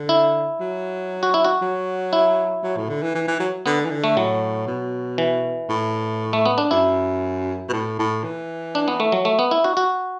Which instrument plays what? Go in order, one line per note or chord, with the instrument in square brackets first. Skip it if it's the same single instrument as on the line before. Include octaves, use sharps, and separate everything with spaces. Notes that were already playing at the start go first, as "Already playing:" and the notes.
Already playing: [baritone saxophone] D3
[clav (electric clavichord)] E4
[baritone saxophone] F#3
[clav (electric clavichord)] F#4
E4
F#4
[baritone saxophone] F#3
[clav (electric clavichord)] E4
[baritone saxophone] F#3
A2
D3
E3
E3
E3
F#3
[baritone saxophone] D3 [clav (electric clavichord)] B3
[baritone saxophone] E3
D3
[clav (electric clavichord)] A3
[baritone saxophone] A2 [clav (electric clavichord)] F#3
[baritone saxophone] B2
[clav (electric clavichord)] E3
[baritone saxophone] A2
[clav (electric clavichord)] A3
B3
D4
[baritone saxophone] F#2 [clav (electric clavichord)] E4
[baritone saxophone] B2
A2
A2
E3
[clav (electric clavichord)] D4
B3
A3
F#3
A3
B3
E4
F#4
F#4